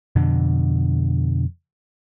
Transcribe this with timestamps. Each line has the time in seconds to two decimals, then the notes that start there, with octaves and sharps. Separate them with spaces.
0.16 F2 B2 D3